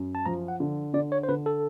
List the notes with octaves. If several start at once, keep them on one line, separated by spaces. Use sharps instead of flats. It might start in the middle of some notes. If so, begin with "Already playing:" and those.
Already playing: F#2
A5
F3 A#5
F#5
D3
D3 D5
C#5
C5
D3 B4
A4